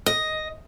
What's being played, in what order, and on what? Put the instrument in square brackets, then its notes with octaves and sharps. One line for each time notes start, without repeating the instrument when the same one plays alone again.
[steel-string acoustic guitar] D#5